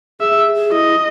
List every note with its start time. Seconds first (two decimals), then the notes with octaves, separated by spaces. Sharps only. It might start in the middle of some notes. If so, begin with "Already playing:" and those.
0.20 G#4 E5
0.37 G#4
0.55 G#4
0.72 E4 D#5